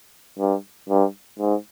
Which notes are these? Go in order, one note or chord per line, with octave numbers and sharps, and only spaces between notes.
G2
G2
G#2